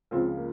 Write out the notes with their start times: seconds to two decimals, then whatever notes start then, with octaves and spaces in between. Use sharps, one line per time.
0.11 C#2 C#3 F3 C4
0.37 A#3